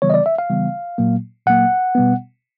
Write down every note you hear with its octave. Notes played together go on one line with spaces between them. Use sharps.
C#3 E3 G3 B3 C#5
D#5
D5
E5
F5
C#3 E3 G3 B3
A#2 F#3 A#3
A#2 F#3 A#3 F#5
B2 G3 B3